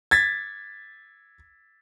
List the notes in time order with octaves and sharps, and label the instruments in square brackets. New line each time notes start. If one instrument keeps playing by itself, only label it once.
[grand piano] G#6 A6 B6